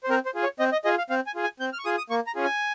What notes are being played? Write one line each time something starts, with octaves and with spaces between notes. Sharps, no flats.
C5
C4 A#4
C5
F4 G#4
C#5
C4 D#5
D#5
F4 G#4 D#5
F5
C4 F5
G#5
F4 G#4
G#5
C4 G6
F6
C#6
F4 G#4 D#6
D#6
A#3 C#6
A#5
C#4 F4 G#4
G#5